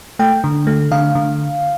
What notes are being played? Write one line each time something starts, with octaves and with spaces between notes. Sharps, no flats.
A3 G5
D3
A3
D3 F5
D3